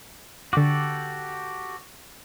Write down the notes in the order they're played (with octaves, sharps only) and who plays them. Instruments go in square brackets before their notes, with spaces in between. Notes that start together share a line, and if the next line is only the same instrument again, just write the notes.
[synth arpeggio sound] D3 D6 [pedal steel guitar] F#4 G4 A4